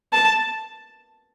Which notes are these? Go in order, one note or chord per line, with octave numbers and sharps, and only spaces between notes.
A5